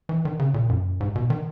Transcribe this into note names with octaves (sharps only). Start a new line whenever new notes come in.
E3
D#3
C#3
A#2
F#2
G#2
B2
D#3